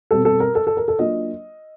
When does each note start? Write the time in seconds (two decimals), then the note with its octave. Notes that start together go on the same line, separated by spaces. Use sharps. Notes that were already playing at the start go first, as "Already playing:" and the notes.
0.11 B2 G3 C4 A4
0.25 A4
0.40 A#4
0.55 A4
0.67 A4
0.77 A#4
0.88 A4
0.99 F#3 A#3 D4 F4 D#5